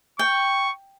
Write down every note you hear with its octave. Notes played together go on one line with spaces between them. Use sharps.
G5 C#6